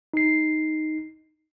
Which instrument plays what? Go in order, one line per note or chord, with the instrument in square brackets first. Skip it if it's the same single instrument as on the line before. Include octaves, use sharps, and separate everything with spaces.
[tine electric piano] D#4 C7